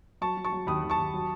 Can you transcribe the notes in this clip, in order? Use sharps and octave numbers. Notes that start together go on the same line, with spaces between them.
F#3 A5 C#6
F#3
A5 C#6
F#3
D#2 B5 D#6
D#2
A5 C#6
D#2
F#3